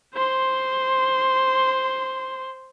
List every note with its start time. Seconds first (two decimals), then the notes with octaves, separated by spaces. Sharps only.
0.15 C5 C6